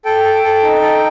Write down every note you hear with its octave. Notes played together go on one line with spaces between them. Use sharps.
A4 G5
A4
A4
D#4
A4